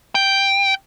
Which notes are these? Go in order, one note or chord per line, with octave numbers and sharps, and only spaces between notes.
G5